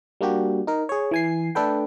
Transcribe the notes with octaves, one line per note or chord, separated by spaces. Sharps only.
G3 A#3 D4 F#4 G4
D#4 A#4
G#4 C#5
E3 G#5 C7
A3 D4 A4 B4 G5